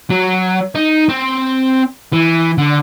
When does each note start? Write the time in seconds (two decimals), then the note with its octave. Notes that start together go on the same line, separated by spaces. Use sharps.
0.10 F#3
0.75 D#4
1.09 C4
2.13 E3
2.58 D3